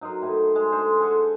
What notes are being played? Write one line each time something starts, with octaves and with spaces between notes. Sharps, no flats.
F#3 D#4 A#4 C5
A2
G#3
D3 G#3 C5
G#4 A4 F#5